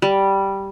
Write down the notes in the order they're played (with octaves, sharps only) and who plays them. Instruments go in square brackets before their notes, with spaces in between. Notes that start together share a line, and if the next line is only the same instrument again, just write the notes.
[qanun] G3